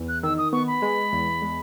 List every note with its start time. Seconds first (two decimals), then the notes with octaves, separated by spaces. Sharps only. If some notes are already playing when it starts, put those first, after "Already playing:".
Already playing: E2
0.09 F#6
0.23 D#3 E6
0.38 D#6
0.53 B3 C#6
0.67 B5
0.82 G#3
1.13 E2
1.42 G#3